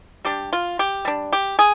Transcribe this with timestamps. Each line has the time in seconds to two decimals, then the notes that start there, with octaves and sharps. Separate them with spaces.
0.25 G3 D4 G4
0.53 F4
0.79 G4
1.05 G3 D4
1.32 G4
1.59 G#4